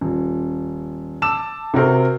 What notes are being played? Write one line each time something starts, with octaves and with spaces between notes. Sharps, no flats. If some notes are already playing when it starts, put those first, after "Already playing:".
D#1
A5 D6 E6 E7
C3 F#4 A#4 C5